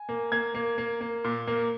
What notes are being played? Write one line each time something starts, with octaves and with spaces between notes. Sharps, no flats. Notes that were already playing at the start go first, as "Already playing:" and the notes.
Already playing: G#5
A#3
A#3 G#6
A#3
A#3
A#3
A#2
A#3